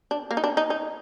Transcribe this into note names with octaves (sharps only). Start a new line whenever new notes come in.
D4
A#3
D#4
D4
D#4
D#4